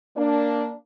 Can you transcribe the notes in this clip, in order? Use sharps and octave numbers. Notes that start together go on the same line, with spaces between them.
A#3 D4